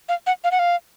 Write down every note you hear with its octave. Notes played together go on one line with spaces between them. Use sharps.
F5
F#5
F5
F#5
F5